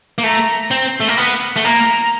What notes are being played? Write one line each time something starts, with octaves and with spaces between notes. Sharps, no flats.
A#3
A3 A#5
C4
A3
A#3
B3 B5
A3
A#3 A#5